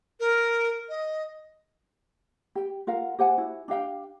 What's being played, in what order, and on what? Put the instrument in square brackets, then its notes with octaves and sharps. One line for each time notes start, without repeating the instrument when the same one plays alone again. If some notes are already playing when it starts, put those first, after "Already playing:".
[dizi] A#4
D#5
[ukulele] G4 G5
F4 A#4 F5 F#5
G4 C5 F#5 G#5
E4 F#4
D4 G4 F5 G5